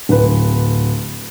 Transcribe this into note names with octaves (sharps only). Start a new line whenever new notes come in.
D1 B4